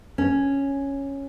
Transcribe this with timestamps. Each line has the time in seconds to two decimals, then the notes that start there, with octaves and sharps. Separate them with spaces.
0.18 C#4